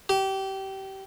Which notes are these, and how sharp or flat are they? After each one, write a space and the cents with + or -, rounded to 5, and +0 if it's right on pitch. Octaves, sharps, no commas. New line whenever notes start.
G4 -25